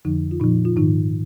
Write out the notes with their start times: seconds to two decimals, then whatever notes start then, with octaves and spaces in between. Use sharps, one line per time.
0.05 F2 D3 F3 D#4
0.31 F4
0.40 A#2 D#4
0.44 F3
0.65 F4
0.76 G#2 D#3 D#4